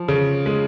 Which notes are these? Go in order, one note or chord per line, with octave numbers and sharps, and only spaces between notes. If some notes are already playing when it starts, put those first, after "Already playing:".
Already playing: F3
C#3
G#3